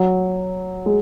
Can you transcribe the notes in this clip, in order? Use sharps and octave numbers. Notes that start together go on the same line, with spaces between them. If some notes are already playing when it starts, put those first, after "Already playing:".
Already playing: F#3
G#3